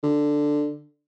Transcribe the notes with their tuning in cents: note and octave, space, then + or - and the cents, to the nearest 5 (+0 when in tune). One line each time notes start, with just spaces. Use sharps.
D3 +5